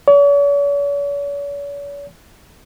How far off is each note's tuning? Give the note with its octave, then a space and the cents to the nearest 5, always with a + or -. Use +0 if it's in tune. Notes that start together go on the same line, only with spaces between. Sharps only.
C#5 +45